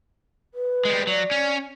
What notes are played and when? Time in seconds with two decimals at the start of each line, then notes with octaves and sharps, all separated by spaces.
0.54 B4
0.85 G3 G#3
1.07 F#3 D5
1.31 C#4